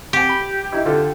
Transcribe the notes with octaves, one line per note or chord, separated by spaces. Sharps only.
C3 G4 F#5 G#5
B5
D#4 E4
D3 F4 A4